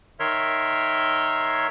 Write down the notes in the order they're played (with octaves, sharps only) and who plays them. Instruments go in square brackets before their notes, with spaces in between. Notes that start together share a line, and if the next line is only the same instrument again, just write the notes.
[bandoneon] D#3 A#4 C#5 E5 C6